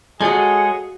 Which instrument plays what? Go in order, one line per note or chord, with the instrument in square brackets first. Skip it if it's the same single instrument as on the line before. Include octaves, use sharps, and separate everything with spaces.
[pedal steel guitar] G#3 A4 C#5 [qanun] F#4 F5 [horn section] G#4